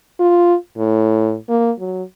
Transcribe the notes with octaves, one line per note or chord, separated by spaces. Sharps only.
F4
A2
A#3
F#3